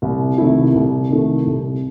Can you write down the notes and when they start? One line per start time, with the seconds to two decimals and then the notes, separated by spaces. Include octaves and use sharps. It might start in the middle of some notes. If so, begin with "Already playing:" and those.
0.02 C2
0.38 C3 D#3 A3 E4
0.74 C2
1.09 C3 D#3 A3 E4
1.46 C2